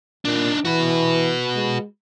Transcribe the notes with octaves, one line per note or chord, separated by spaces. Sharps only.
A#2 D4 D#4
E3 F#4 B4
G#3